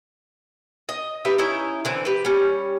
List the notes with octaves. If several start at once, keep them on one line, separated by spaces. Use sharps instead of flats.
D#5
D#4 G4 B4 E5
C#4 D#4 E4
D3 E3 C4
G4 B4
G3 C#4